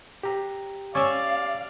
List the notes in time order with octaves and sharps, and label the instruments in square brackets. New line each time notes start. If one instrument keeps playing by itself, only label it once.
[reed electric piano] G4 A#5
[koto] C#4 E5 [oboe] D5 [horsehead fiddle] F5